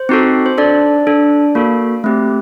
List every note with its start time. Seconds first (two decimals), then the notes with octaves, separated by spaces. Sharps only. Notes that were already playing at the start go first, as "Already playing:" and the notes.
Already playing: C5
0.09 C4 D#4 F#4 A4
0.46 C5
0.58 D4 A4 D5
1.07 D4 A4
1.55 A#3 F#4 A4
2.04 A3 C4 G4